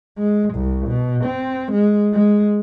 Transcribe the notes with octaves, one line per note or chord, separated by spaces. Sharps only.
G#3
C2
B2
C4
G#3
G#3